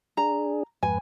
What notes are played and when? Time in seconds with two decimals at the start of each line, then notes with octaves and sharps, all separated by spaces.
0.17 D4 G#4 A#5
0.83 F2 G#2 B4 G#5